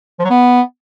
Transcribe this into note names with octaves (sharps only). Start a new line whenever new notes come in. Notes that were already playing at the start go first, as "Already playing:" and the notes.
F3
F#3
B3